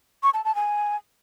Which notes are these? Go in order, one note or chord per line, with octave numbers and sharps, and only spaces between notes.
C#6
A5
A5
G#5